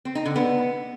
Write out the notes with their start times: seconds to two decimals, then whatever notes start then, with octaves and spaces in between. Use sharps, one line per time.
0.05 C4
0.15 D#4
0.25 D3
0.36 B3